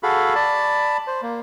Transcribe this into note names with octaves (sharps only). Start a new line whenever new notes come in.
F#4 G#4 A4 F5 B5
D5 A5 B5
C5
A#3